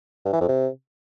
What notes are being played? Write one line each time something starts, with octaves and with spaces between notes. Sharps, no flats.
G2
E3
F2
C3